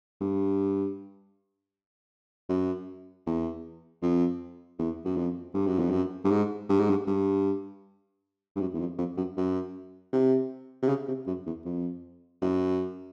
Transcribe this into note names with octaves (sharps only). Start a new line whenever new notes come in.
G2
F#2
E2
F2
E2
F#2
F2
G2
F#2
F2
F#2
G2
G#2
G2
G#2
G2
G2
G2
F#2
E2
F2
F2
F#2
F#2
C3
C3
C#3
C3
F#2
E2
F2
F#2